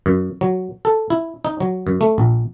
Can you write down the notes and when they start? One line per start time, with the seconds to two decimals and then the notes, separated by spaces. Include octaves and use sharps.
0.06 F#2
0.41 F#3
0.85 A4
1.10 E4
1.45 D#4
1.60 F#3
1.87 F#2
2.01 A3
2.18 A#1